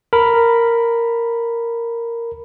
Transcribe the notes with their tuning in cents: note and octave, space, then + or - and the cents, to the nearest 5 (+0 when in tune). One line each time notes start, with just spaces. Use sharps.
A#4 -5 B5 +0